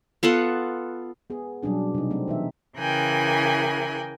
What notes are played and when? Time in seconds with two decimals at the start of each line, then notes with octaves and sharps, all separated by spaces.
0.23 B3 F4 A4 F#5
1.30 B3 G#4
1.63 B2 F#3 G3 C#4 D4 G#4
1.94 C3 D#4
2.11 A3 C4
2.28 E3 D#4 E5
2.79 C#3 E3 A#4 G5 G#5 F#6